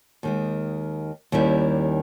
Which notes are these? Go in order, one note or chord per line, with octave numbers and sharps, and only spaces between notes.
D#2 D#3 G#3
D#2 D#3 G3 C#4 E4